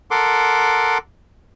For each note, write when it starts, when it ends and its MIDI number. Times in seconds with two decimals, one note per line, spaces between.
0.11 0.98 69
0.11 0.98 70
0.11 0.98 78
0.11 0.98 84
0.11 0.98 86